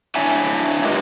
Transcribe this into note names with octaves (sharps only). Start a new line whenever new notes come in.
D4 E4 C#5 E5 G#5
G#3 F4 G4 A#4 B4 D#5